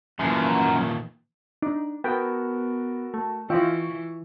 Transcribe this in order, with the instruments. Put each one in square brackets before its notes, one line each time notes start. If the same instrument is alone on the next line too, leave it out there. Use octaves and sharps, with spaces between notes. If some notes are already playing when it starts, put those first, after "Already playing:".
[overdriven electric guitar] F#2 [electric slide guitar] A#2 D#3 A3 [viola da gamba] E3 A#3
[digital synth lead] D4 [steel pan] D#4
[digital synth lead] B3 [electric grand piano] F#4 A4 A#4 [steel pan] G5
[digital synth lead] A3
[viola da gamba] E3 [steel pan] F4 D#5 G5 [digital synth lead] C#6 [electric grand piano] E6